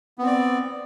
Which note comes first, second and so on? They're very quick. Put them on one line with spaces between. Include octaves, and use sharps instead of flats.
B3 C4 D5